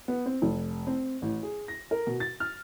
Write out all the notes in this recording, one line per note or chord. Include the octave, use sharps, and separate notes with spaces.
B3
C4
F1
C4
A1
G#4
A#6
A#4
B2
A6
F6